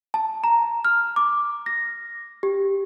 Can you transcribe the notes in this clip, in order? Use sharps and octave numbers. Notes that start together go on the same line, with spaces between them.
A5
A#5
F6
D6
A#6
G4